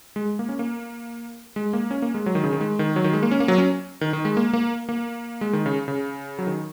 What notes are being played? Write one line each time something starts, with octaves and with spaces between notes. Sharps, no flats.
G#3
A#3
C#4
A#3
G#3
A#3
C#4
A#3
G#3
F#3
D#3
C#3
D#3
G#3
D#3
F#3
D#3
G#3
A#3
C#4
A#3
F#3
C#4
D#3
D#3
G#3
A#3
A#3
A#3
G#3
D#3
C#3
C#3
F#3
D#3